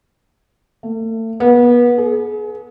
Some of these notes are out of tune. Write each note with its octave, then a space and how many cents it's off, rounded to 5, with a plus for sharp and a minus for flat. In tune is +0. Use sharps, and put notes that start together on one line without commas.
A3 +35
B3 -30
G#4 +30